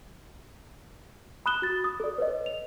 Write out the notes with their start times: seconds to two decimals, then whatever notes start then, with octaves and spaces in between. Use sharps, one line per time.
1.46 B5 D#6 F#6 E7 G7
1.62 F#4 A6
1.84 D#6
2.00 A4 D5
2.18 B4 C#5 D#5
2.46 F7